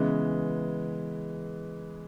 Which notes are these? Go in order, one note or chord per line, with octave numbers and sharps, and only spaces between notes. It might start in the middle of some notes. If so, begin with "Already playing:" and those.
Already playing: C#3 E3 G#3 B3